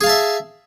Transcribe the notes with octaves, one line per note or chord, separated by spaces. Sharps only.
G#4 E5 F5 A5